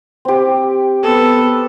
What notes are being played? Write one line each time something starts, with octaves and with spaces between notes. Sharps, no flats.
C4 G4
B3 A4